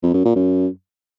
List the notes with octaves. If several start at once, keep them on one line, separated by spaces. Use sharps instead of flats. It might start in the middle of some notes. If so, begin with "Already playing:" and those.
F2
F#2
A#2
F#2